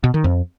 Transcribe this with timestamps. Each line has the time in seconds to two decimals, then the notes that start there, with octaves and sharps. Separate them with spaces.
0.04 B2
0.14 D#3
0.24 F2